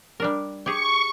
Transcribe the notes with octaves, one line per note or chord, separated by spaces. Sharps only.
G3 D4 A#4
G4 G#4 C#6